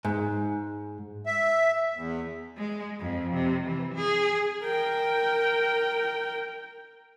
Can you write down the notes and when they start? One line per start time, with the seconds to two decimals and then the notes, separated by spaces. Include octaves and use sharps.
0.05 G#2
1.26 E5
1.95 E2
2.57 G#3
3.00 F2
3.33 C3
3.67 E3
3.95 G#4
4.63 A#4 G5